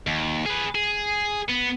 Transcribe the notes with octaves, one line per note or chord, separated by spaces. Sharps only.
D#2
G#4 B4
G#4
B3